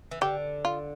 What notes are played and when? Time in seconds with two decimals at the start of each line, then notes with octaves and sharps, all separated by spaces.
0.11 E3
0.21 D3 G4
0.65 F4